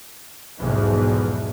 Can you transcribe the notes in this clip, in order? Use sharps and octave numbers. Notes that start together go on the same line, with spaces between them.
B1 E2 G#2 B2 E3 F3